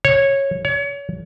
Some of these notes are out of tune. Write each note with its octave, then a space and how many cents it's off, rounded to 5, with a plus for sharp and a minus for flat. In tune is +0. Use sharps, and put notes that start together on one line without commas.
C#5 -15
C#5 +30